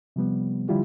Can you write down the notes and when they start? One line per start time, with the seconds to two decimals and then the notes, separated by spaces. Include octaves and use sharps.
0.16 C3 F3 G3 B3
0.69 D3 F3 G3 E4 F4 G4